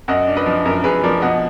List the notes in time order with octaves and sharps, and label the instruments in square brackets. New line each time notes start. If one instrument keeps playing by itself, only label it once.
[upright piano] F#2 D#5 F#5
D4
B4 D#5
F3
F#2 A#4
F#2 G#4 B4
F3 A#4 D5
B2 D#5 F#5